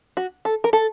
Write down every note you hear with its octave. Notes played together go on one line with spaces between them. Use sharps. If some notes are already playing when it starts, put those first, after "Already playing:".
F#4
A4
A#4
A4